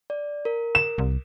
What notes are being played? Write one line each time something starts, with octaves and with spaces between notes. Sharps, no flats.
D5
A#4
E7
C2